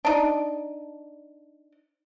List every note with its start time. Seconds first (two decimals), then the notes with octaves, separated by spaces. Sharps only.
0.05 D4 D#4